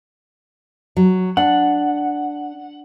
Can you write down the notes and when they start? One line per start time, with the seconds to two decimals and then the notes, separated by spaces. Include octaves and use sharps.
0.97 F#3
1.37 D4 F#5